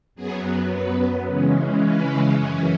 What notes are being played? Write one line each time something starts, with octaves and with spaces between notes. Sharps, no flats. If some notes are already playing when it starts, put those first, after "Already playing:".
F#2 F#3 B3 G#4
B4
C#3 E3 G#3 C#4
B4
F#2 E3 C#4